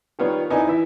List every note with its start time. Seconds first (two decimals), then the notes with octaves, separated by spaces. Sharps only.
0.19 D#3 G3 B3 F4 C#5
0.50 B3 D#4 E4 D5 G#5
0.67 E3 E5